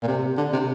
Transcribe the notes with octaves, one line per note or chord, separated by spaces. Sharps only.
A#2
C3
D3
C3